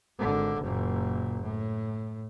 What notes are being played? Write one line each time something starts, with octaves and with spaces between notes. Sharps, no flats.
G#1 D3
F#1 A#2
A2